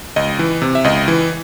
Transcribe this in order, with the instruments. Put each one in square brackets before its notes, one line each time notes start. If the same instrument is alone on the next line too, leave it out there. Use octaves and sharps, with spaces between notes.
[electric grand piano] C#2 D#5
E3
C3
E5
C#2 D#5
E3